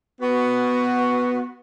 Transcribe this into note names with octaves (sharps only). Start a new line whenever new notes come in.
B3 F#4